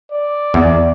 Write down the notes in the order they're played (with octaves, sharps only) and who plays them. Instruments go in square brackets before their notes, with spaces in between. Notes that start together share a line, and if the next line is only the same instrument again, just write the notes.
[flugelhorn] D5
[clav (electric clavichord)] E2